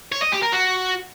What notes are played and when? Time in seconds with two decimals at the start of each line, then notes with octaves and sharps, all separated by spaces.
0.12 C#5
0.22 D#5
0.33 G4
0.43 A#4
0.53 F#4